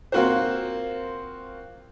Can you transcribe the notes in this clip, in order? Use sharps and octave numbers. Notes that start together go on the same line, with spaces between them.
A#3 C4 F4 F#4 A#4 C5